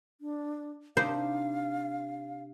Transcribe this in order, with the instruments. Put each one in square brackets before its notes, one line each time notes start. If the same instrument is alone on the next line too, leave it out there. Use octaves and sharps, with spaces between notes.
[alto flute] D4
[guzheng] C3 D4 D#4 [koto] C5 [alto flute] F5